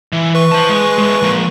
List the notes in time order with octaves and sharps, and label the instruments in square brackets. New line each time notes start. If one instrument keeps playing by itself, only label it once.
[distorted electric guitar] E3
[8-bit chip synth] B4 C#6
[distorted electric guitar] C5 A5
G#3
G#3 E4
F3 A#3